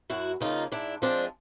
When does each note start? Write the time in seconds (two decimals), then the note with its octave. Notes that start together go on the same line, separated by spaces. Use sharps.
0.10 F#2 E4 F#4
0.40 C#3 F3 A#3 D#4 F4
0.72 G#2 D4 E4
1.02 F3 G#3 C4 D4